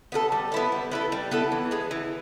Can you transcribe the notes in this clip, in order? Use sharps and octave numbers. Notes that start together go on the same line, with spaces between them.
B3 E4 A4
G3
B3 E4 A4
G3
B3 E4 A4
G3
B3 E4 A4
E3
G#3 B3
E3